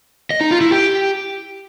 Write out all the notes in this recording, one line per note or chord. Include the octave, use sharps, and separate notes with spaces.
D#5
D#4
F4
E4
G4